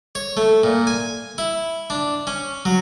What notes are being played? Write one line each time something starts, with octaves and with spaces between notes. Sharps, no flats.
C#5
A3
A#2
G#5
E4
D4
C#4
F#3